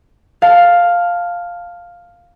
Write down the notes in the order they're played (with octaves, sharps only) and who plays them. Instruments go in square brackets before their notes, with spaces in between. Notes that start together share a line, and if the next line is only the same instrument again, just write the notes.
[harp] F5 A5